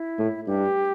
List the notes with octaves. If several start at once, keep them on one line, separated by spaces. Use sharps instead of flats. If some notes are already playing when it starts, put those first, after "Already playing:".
Already playing: E4
A2
G2 G4